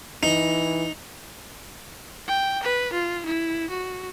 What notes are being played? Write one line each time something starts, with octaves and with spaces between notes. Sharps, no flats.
E3 D#4
G5
B4
F4
E4
F#4